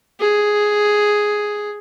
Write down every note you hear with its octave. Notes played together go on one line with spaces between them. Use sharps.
G#4